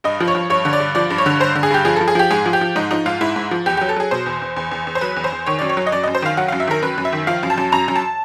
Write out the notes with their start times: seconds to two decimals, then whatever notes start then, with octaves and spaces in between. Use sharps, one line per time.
0.04 G2 D#5
0.20 F3
0.28 C#5
0.35 F3
0.50 G2 C#5
0.65 D3
0.73 D5
0.80 G2
0.95 F3 D5
1.10 G2
1.18 C#5
1.26 D3
1.40 G2 C5
1.55 D3
1.63 G#4
1.70 G2 G4
1.85 F3 G#4
1.96 F3 A4
2.08 G#4
2.15 F3 G4
2.31 G#2 G#4
2.46 F3
2.53 G4
2.61 F3
2.76 G#2 D#4
2.91 F3 D#4
3.06 G#2 F4
3.21 G#2 E4
3.36 G#2
3.51 F3
3.66 E2 G4
3.77 F#3 G4
3.89 A4
3.96 F#3 G#4
4.11 B2 C5
4.26 E2
4.42 E2
4.56 E2
4.71 E2
4.87 E2
4.95 C5
5.01 F#3 B4
5.16 E2
5.24 C5
5.32 E2
5.46 D#3 C#5
5.59 F#2 D5
5.69 C#5
5.77 F#3
5.87 D#5
5.92 F#2 D5
6.04 F#2 D#5
6.15 C5
6.22 D#3 F5
6.37 F#3 F#5
6.48 F#2 F5
6.60 E5
6.67 D#3 A#4
6.82 F#2 B4
6.98 F#2
7.05 E5
7.13 D#3
7.27 F3 F5
7.43 F#2
7.50 A5
7.58 F#2
7.72 F#2 A#5
7.88 F#2
7.96 A5